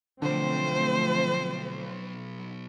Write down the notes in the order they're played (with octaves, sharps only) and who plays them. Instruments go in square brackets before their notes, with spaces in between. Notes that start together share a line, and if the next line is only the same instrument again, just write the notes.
[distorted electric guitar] B1 [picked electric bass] D3 [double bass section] F3 A3 C4 [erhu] C5